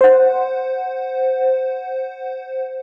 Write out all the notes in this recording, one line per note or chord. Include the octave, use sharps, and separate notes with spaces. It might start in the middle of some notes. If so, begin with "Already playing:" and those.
C5 F#5